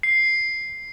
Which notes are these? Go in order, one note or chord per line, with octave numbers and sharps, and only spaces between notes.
C7